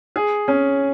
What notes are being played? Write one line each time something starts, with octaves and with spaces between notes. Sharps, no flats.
G#4
C#4